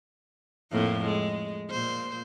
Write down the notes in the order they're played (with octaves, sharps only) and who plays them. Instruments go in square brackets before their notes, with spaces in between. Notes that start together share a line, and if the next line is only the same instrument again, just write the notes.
[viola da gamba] F2 A2 A#3
G#3
A#2 C5